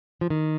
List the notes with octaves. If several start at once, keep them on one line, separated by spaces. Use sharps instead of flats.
F3
D#3